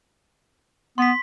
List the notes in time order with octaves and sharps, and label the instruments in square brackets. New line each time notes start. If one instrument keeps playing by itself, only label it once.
[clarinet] B3 [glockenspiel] C6 B6